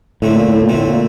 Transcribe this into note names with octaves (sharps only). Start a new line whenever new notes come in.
A2 D3 A3 C4
A#2
A2
A#2
D3 A3 C4
A2
A#2